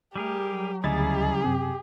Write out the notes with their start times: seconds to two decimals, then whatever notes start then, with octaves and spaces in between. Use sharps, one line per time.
0.16 G3 A3 G4 G#4 A#4
0.46 F#3
0.84 D2 C#3 G3 E4 G#4 D#5 A6
1.44 F#2 C3 G4